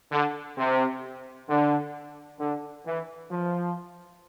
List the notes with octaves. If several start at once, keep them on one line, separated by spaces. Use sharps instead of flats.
D3
C3
D3
D3
E3
F3